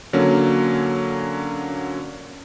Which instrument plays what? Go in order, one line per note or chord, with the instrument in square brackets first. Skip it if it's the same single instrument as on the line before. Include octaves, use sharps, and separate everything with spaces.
[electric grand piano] D3 F#3 A#3 C#4